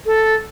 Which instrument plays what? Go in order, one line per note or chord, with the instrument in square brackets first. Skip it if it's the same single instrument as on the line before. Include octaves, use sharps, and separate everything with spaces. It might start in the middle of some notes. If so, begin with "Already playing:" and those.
[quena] A4